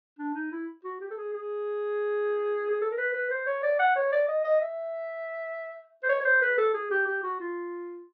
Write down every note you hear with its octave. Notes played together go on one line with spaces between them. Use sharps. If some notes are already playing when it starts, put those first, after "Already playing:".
D4
D#4
E4
F#4
G4
A4
G#4
G#4
G#4
A4
A#4
B4
B4
C5
C#5
D5
F#5
C#5
D5
D#5
D#5
E5
C5
C#5
C#5
C5
B4
A4
G#4
G4
G4
F#4
F4